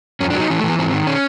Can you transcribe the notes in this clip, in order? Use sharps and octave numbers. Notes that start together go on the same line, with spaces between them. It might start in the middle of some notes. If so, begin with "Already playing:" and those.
F2 C#4
D4
F#3
D#4
E3 C#4
A3
E3
B3
G#2 C4
D#3
C#4